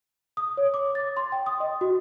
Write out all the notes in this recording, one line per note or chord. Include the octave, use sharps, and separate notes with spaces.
D#6
C#5
D6
A6
C6
G5
D#6
D#5
F#4